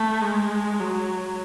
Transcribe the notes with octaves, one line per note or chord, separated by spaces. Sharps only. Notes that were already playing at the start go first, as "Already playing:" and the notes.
Already playing: A3
G#3
F#3